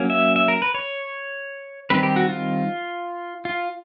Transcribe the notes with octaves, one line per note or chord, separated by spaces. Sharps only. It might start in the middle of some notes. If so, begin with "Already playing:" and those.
Already playing: F#3 A#3 C#4
E5
E5
A#4
B4
C#5
D#3 G3 C4 B4
G4
F#4
F4
F4